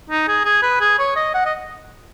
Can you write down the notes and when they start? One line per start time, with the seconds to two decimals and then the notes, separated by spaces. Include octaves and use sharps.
0.10 D#4
0.28 G#4
0.45 G#4
0.62 B4
0.81 G#4
0.99 C#5
1.16 D#5
1.34 F#5
1.45 D#5